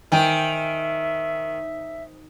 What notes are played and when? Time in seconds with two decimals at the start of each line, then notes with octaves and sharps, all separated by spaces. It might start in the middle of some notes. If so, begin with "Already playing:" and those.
0.12 D#3 C5 E5 G5 G#5